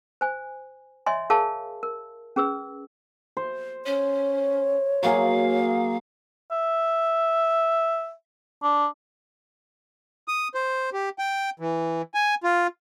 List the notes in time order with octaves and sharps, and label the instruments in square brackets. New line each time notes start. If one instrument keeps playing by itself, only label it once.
[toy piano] C5 G#5
C#5 D#5 E5 G#5 C6
G#4 A#4 C#5 F5 A5
A#4
C#4 G#4 B4 E6
[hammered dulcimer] C5
[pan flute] C#4 [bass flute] C#5
[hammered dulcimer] F#3 A#3 G#4 [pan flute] F5
[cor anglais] E5
D4
[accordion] D#6
C5
G4
G5
E3
G#5
F4